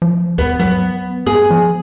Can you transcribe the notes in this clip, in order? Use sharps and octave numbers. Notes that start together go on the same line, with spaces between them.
F3
D#2 B3
F#3 B3
B3 G#4
F3